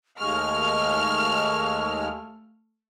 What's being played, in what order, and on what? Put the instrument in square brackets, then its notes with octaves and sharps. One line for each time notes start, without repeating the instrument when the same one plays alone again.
[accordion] D#2 G#3 [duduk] A3 [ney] C#6 [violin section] F6